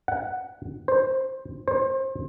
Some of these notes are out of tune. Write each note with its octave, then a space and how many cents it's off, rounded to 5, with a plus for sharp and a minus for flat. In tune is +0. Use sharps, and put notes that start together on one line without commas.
F#5 +5
C5 +10
C5 +30